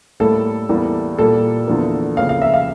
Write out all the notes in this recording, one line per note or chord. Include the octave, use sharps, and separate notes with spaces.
A2 G3 A#3 A4
E2 E3 G3 A#3
A#2 G3 A#3 A4
E2 D3 F3 A#3
F2 C#3 F3 A#3 F5
F5
E5
F5